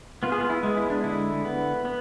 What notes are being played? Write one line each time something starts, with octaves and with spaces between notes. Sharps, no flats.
B3 F4
G#4
F4
E4
G#3
E4
D4
D3 E4
B3
B3